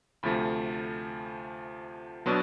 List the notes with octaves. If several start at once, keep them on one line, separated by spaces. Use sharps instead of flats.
D2 C3 F3 A3 B5
B2 F#3 B3 D4 C6